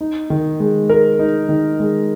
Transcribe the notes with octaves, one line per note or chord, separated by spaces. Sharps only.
D#4
D#3
G#3
A#4
D#4
D#3
G#3